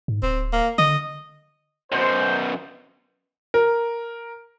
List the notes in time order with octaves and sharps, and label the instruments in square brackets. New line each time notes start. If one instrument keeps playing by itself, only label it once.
[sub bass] G#2
[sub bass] D1 [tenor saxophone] C4
[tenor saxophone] A#3
[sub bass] D3 [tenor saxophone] D#5
[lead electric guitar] F#2 B2 [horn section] C5
[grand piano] A#4